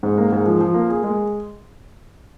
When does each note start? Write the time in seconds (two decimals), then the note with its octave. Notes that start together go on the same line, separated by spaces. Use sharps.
0.03 G#2
0.18 A#3
0.32 G#2
0.46 F3
0.61 F3
0.74 A#3
0.90 G#4
1.04 G#3